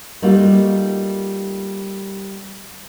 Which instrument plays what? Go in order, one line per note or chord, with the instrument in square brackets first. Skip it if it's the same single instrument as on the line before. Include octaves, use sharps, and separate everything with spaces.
[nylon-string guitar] G3 A3 A#3 D#4 F4 F#4